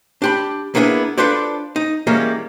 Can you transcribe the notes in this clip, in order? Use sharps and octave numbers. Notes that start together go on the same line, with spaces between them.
D4 G4 B5
A#3 B3 D4 E4 G#4
D4 F4 A4 B4 C5 D5
D#4
E3 G3 G#3 A#3 C#4